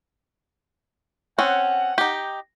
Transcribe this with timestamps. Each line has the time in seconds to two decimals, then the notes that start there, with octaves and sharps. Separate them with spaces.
1.39 C4 C#4 F#5
1.98 D#4 G4